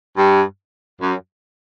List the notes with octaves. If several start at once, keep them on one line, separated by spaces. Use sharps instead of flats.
G2
F#2